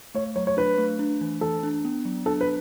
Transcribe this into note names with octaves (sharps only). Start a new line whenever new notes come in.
A3 C#5
F#3 C#5
C#5
D4 B4
A3
D4
E3
E3 A4
D4
B3
F#3
D4 A4
B4